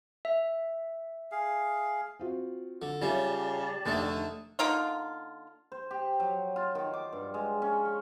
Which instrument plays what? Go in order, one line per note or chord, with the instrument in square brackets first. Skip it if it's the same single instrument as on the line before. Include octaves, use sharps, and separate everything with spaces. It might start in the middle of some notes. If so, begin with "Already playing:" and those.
[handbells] E5
[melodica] G#4 F5
[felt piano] C4 F4 F#4
[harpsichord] D3
[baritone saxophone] C#3 [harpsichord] G3 [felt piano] F4 C#5 E5 [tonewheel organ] G4 D5 A5
[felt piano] F1 A6 [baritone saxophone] D3 [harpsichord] D#3 A3
[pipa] D3 A#3 D#4 F4
[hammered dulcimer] C5
G4
F#3
F4
D#3
D6
G2
G#3
C#4
C#6